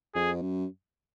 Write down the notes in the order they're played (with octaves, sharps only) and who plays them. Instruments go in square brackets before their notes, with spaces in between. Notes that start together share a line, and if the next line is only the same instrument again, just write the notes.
[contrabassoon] F2 [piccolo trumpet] G#4
[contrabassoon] F#2